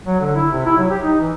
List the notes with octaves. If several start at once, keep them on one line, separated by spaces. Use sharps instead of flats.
F#3
D3
E4
C3
E4
F#3
G4
D#4
E3